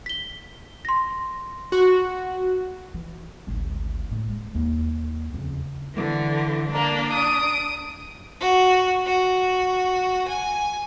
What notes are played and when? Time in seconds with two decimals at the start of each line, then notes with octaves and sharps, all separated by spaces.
0.06 B6 G7
0.85 C6 A#6
1.72 F#4
2.94 E3
3.47 G#1 D2
4.11 A2
4.29 G#3
4.55 D#2
5.34 F2 C#3
5.95 D3 E3
6.73 A#3 D4
7.12 D#6 D7
8.40 F#4
9.06 F#4
10.28 G#5